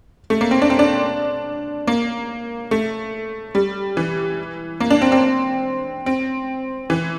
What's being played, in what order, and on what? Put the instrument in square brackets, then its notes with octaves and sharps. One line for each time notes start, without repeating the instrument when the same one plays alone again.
[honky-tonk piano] A3
A#3
C4
D4
C4
D4
A#3
A3
G3
E3
A#3
D4
C4
C4
C4
E3